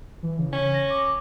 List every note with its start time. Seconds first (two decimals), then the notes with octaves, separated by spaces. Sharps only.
0.23 E3
0.39 C#3
0.53 C#4
0.73 A#6
0.90 D6